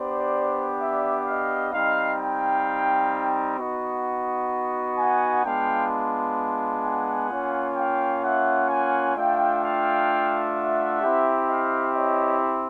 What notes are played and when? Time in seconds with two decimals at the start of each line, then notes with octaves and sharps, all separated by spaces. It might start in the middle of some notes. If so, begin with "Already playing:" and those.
Already playing: B3 D4 G4 C5 D5
0.80 D5 E5
1.26 D#5 F5
1.73 G3 C4 D#4 D#5 F5
2.20 F5 G5
3.58 B3 D#4 F#4
4.98 F#5 G#5
5.44 G#3 B3 D4 F4 F5 G5
6.84 F#5 G#5
7.30 A#3 C#4 F4
7.76 F5 G5
8.23 E5 F#5
8.69 F#5 G#5
9.16 A3 D4 F4 F5 G5
9.62 F5 G5
10.55 E5 F#5
11.02 C4 E4 G4
11.47 D#5 F5
11.94 C#5 D#5